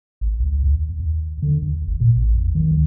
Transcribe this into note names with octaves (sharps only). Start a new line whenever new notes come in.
G#1
C#2
D#2
D#2
D3
D#2
G1
A#2
A1
E2
D#3
D2